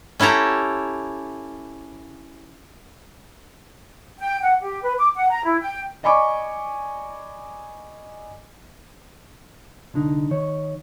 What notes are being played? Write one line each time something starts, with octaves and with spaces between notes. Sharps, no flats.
C#4 E4 G4 A4 A#5
G5
F#5
G4
B4
D6
F#5
A#5
E4
G5
D5 D#5 G#5 B5 C#6 D6
C2 D3 D#4
D#3 C#5